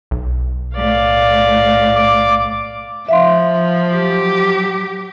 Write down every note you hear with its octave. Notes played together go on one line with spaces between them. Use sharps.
B1
A2 D5 F5
D6
F3 E5 F5 C6
F#3 G4